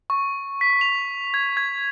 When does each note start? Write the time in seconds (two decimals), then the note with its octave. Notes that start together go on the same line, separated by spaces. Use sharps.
0.10 C#6
0.61 B6
0.81 F7
1.34 G#6
1.57 G#6